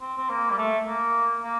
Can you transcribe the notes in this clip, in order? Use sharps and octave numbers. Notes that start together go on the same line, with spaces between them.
C4
C4
A#3
G3
A3
A#3
A#3